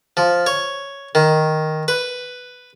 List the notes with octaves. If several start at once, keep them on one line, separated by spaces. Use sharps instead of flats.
F3
C#5
D#3
B4